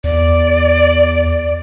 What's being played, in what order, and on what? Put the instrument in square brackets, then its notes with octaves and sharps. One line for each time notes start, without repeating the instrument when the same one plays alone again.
[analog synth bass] E2 [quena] D5